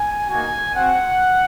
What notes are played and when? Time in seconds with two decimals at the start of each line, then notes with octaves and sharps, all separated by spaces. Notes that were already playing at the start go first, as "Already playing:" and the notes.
Already playing: G#5
0.29 A#3 D#4 F#4 G#5
0.75 C4 F#4 F#5